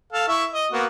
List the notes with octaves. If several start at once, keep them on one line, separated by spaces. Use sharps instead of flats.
A4 F5
E4 E5 C#6
D#5
A#3 B3 F#4